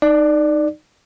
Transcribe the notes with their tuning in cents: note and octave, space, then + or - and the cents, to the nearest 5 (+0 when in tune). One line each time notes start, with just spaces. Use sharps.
D#4 -15 D5 +10